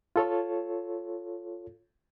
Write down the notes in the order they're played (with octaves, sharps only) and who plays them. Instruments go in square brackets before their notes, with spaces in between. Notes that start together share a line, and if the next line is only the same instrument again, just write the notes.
[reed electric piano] F4 A4 C#5